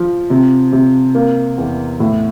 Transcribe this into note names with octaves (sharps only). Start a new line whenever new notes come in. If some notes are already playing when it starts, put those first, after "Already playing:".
Already playing: F3
C3
C3
A#3
E2
A2